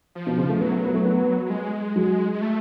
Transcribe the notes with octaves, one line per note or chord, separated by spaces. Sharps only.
F3
B2
C#3
A3
F#3 B3
A3
B3
A3
B3
F#3
G#3
F#3
G#3
A3